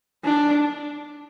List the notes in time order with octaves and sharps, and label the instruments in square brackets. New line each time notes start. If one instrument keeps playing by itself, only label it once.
[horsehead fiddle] D4